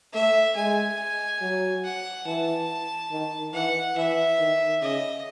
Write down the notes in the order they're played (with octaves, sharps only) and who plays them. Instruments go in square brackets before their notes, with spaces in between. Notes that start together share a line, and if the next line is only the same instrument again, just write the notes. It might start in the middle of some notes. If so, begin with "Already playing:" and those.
[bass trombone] A3 [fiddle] E5
[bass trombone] G#3 [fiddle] G#5
[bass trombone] F#3
[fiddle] F#5
[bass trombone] E3 [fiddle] A5
[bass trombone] D#3
[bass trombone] E3 [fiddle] F#5
[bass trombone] E3 [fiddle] E5
[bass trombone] D#3
[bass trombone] C#3 [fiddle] D#5